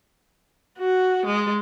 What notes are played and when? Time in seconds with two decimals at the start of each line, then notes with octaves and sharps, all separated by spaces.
0.78 F#4
1.26 G#3